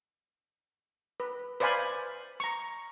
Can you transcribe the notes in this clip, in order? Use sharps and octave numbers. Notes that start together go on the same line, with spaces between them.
B4
B4 C5 D5 F5 G#5 B5
A#5 C#6